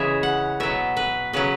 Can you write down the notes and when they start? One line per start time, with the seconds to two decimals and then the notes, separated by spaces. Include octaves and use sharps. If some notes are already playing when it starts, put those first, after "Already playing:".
Already playing: C#3 E3 G#3 E5
0.23 F#5
0.60 B2 F#3 E5
0.97 B4
1.33 C#3 F#3 B4